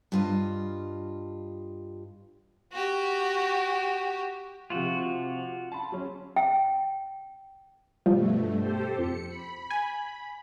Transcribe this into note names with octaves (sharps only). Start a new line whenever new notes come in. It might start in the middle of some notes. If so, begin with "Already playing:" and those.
G2 F4 D#5
F#4 G4
C3 F3 F4 F#4
A5 B5 C6
F#3 C#4
G5
G2 B2 F3 G3 A3
G4 A4 C5
F2 C#7
B5
G#5